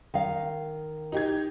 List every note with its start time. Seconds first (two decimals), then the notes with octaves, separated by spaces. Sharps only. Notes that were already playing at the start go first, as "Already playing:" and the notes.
0.14 D#3 F5
1.12 D#4 G4 G#6